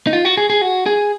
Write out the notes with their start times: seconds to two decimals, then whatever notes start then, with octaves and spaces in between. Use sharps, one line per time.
0.07 D#4
0.13 F4
0.25 F#4
0.37 G#4
0.50 G#4
0.62 F#4
0.86 G#4